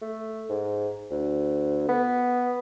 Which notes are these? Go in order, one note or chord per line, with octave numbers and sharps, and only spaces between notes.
A3
G#2
D2
B3